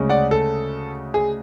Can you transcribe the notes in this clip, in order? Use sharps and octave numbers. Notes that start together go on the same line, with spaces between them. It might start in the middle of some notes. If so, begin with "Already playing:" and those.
Already playing: D2 C#3 G#3 C#4
D5 F#5
A4
G#4